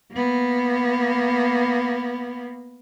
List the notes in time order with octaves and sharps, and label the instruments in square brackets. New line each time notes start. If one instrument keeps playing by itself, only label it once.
[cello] A#3 B3